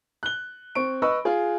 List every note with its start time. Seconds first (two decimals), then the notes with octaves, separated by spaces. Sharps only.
0.23 F#6 G7
0.75 C4 C#6 D7
1.02 B4 D#5 B5 C#6 E6
1.25 F4 G#4